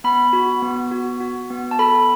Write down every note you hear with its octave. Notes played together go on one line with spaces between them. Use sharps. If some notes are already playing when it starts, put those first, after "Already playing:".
B3 B5
F#4
B3
F#4
F#4
B3
A5
A4 B5